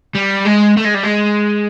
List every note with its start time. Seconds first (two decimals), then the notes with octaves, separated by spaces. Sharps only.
0.15 G3
0.46 G#3
0.77 A3
0.85 G#3
0.95 G3
1.03 G#3